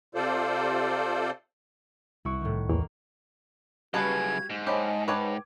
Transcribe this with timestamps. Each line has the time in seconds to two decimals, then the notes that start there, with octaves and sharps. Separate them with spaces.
0.15 C3 F4 A4 C5 D5
2.25 C2 E4 F#4 C#6
2.41 A2 D#3
2.69 E2 A#3
3.94 F#2 C#3 G3 F4 F#4 B4 A5 G#6
4.50 G#2
4.67 G4 C5 C#5 D#5 G#5 A5 B5
5.08 B4 C#5 G5 A5 D6 G#6